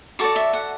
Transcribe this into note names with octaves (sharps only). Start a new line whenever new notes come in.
F#4 A4 D5 D6
E5
F#5